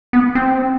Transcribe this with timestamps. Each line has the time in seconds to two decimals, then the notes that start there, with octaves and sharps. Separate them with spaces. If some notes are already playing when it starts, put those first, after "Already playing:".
0.13 B3
0.35 C4